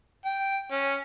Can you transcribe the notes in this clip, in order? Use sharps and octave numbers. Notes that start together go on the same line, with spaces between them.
G5
C#4